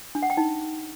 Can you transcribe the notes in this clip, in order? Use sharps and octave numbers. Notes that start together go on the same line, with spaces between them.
D4
F#5
G5
D#4